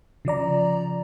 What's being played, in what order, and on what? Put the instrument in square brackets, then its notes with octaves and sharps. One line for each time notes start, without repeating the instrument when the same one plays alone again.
[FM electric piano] C#3 F3 D5 A#5